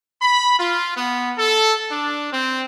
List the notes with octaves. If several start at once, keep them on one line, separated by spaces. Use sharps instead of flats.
B5
F4
B3
A4
D4
C4